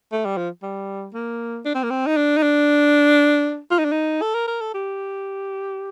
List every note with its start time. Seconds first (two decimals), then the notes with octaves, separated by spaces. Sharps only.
0.12 A3
0.25 G3
0.38 F3
0.63 G3
1.14 A#3
1.65 D4
1.75 C4
1.83 A#3
1.91 C4
2.06 D#4
2.17 D4
2.37 D#4
2.43 D4
3.71 F4
3.78 D#4
3.85 D4
3.92 D#4
4.22 A4
4.35 A#4
4.48 A#4
4.61 A4
4.74 G4